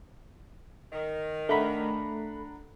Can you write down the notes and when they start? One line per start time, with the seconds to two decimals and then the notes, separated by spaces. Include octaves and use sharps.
0.92 D#3
1.49 A3 D4 F#5 A#5 B5